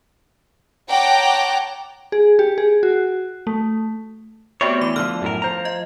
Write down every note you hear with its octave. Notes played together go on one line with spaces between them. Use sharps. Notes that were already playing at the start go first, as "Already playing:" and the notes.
C#5 F#5 G5 A5 A#5 D6
G#4
G4
G#4
F#4
A3
A3 B3 C4 F#4 G4 C#5
E3 D6
D3 F3 F6
F#2 A2 A#4
F3 C5 A#5
D#5